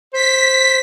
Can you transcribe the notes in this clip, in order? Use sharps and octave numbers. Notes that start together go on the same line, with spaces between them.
C5 B6